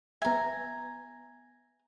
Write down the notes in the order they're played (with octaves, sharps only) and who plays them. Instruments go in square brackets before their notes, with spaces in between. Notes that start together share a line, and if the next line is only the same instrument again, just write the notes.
[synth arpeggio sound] B3 E5 [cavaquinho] G#5 A#5